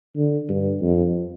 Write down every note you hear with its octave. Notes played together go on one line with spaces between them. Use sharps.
D3
G2
F2